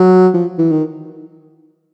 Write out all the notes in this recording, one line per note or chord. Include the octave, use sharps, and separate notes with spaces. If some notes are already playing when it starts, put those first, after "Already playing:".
Already playing: F#3
F3
E3
D#3